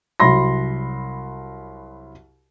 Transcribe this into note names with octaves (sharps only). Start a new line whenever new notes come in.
C2 F#3 B5 C6 A#6